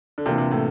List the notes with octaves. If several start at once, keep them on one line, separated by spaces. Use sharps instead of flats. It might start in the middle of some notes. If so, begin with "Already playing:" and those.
D3
C3 E3 A#3 D4 F4
C3
A2